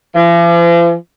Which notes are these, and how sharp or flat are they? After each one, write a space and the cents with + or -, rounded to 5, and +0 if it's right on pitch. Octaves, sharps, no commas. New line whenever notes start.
F3 -45